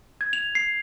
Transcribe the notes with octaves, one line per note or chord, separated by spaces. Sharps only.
G#6
F7
C7